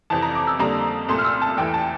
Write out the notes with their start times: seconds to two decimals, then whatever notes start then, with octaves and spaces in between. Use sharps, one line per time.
0.10 F2 C3 E3 A5
0.22 A#5
0.35 D6
0.47 E6
0.59 F2 D3 G3 A#3 A#5
1.09 C2 A#2 A3 C6
1.18 F6
1.24 E6
1.42 A5
1.57 E2 E3 A3 G5
1.74 A5